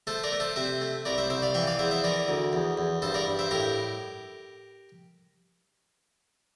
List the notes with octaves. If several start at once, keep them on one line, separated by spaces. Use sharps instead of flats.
A3 A4 C5
A#4 D5
A3
A4 C5
C3 C5 E5
A3
C2 A#4 D5
C5 E5
C2 C5 E5
D5 F5
E3 E5 G5
D5 F5
E2 C5 E5
C5 E5
E3 A#4 D5
D2
E2
E2
G2 A4 C5
A#4 D5
G2
C5 E5
A2 G4 A#4